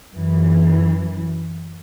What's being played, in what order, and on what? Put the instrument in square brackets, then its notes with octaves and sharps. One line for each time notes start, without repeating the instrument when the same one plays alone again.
[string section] F#2 E3